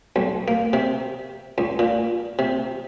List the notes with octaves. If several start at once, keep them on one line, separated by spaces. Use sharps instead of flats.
B1
A#3
C3
C#2
A#2
C3